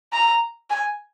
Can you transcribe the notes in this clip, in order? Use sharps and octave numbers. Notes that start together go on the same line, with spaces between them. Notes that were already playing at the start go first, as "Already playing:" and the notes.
A#5
G#5